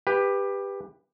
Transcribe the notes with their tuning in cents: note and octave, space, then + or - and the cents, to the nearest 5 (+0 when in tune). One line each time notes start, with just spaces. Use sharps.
G4 +15 B4 +0